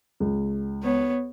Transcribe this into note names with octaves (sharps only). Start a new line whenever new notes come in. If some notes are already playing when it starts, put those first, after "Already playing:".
C#2
B3 C#5